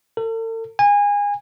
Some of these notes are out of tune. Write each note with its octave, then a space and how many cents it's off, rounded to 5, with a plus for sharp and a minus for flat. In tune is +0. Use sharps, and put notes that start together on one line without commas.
A4 +45
G#5 -25